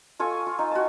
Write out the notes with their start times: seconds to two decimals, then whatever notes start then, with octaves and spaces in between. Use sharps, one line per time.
0.20 F4 A4 G#5 C#6
0.46 F4
0.59 D#4
0.71 F#4 A5